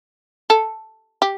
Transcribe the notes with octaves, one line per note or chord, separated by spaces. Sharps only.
A4
G4